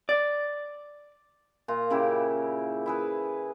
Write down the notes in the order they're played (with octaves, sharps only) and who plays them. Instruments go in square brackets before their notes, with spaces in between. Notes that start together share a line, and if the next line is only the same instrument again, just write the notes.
[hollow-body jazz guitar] D5
[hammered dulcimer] A#2 F4 A#5
C#3 E4 G4 D6
E4 G#4 B4